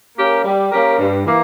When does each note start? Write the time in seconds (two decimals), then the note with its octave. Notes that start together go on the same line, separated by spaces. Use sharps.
0.17 A#3 C#4 G4 A#4
0.44 G3
0.71 A#3 C#4 G4 A#4
0.99 G2
1.26 E3 A#3